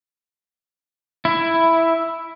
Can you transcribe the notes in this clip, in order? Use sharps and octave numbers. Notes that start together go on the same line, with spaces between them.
E4